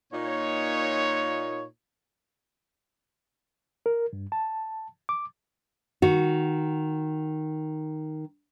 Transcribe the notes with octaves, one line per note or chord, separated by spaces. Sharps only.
A#2 D#4 C#5
A#4
G2
A5
D6
D#3 F#4